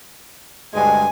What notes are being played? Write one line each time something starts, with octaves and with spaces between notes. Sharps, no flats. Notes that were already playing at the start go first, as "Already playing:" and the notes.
D2 G2 G#3 G#5